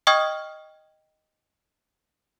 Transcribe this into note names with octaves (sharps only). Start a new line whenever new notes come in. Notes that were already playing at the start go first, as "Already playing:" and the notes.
D#5 G5 C#6 D#6 F6 G#6